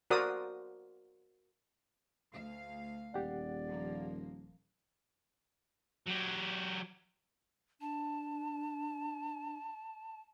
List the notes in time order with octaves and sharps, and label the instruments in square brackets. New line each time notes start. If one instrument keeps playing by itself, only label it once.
[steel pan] F#4 A#4 C5 D5 D#6
[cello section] D2 F5
[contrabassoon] D#1 [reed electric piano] G4 F#5 [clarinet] D5
[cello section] F3 A#3
[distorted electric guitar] F#3 G4
[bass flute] D4 [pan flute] A5